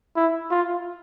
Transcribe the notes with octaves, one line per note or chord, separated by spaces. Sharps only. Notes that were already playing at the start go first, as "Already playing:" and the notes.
E4
F4